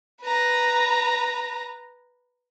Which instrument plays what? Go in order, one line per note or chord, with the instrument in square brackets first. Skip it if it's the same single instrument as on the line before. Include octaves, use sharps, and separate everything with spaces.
[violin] B4 A#5